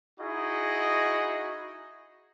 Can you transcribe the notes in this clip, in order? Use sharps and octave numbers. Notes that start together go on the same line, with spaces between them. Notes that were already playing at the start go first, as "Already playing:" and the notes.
D#4 E4 F#4 G#4 D#5